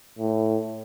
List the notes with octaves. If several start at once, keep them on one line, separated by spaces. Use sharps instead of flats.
A2